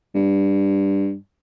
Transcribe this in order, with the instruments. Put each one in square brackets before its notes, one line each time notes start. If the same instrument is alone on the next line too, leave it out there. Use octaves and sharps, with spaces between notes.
[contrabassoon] G2